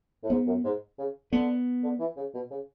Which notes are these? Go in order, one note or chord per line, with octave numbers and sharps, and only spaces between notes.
A2
G#2 B3
F#2
G#2
C#3
D3 B3
D3
E3
C#3
B2
C#3